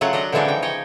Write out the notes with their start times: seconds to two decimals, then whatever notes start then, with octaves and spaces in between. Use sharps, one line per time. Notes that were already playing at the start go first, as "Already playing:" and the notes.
0.01 C#3 F#3 A3 F4 F#5
0.13 D4 D#5 F#5 A#5
0.32 D3 E3 F3 G#3 D4 D#4
0.45 C#3 G5
0.62 C#5 D#5 G5